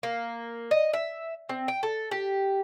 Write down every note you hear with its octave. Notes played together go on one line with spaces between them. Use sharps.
A#3
D#5
E5
C4
G5
A4
G4